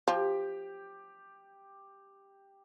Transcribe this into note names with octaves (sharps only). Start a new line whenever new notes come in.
F3 G4